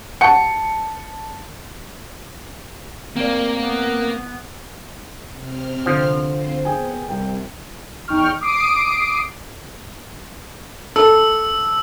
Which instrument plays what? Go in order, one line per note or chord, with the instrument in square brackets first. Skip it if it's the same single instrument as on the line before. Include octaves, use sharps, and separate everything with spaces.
[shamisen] F#4 G4 F#5 [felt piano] A5 C#7
[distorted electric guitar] A#3 [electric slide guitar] C4 D5
[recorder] B3
[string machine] C3 C4 F6
[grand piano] D3 [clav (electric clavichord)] F3
[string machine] C4 F4 C5
[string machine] B3 [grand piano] G#4 G5 G#5
[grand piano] C2 G5 [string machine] C3
[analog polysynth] E2 D#4 G5 C#6 F6
D6 D#6 C7 D7
[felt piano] A4 [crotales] E6